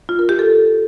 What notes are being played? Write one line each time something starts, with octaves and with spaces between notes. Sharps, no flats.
F4
A#4
G4
A4